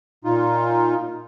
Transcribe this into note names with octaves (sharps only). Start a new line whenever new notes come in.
A#2 D#4 F4